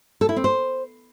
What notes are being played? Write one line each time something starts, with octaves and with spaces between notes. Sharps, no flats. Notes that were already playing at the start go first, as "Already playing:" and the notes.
A4
E4
C4
C5